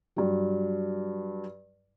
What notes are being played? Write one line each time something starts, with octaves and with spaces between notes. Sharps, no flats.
G2 F#3